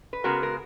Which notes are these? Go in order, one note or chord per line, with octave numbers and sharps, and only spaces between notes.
B4
C#3 G#3 B3 F#4 A#4
A#4